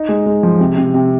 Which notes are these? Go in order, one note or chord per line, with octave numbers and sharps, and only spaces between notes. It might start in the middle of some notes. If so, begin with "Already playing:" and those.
Already playing: D#4
G#3
G#3
F3
C3
C3
C3